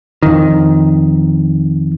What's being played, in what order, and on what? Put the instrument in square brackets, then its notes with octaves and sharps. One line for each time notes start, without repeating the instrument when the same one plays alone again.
[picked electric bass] F2 D#3